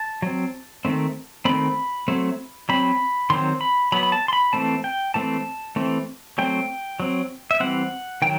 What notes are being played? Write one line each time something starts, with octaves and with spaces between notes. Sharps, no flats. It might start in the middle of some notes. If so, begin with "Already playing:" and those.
Already playing: A5
F#3 C4
D#3 A3 C4
D#3 A3 C4 B5
F#3 A3 C4
F#3 C4 B5
D#3 F#3 C4 C6
B5
F#3 B3 B5
B5
A5
C6
B5
E3 A3 C4 A5
G5
E3 A3 C4 A5
E3 A3 C4
F#3 A3 C4 G5
F#3 C4
E5
E3 G3 C4 F#5
D#3 F#3 G5